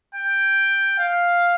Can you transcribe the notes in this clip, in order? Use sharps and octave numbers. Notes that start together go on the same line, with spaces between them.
G5
F5